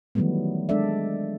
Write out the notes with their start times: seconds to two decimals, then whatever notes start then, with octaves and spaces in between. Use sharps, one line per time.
0.15 D#3 E3 F#3 G3 A3 B3
0.69 G#3 D4 A4 D5 E5